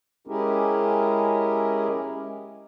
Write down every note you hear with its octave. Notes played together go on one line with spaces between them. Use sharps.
G#3 C#4 E4 G4 G#4 A#4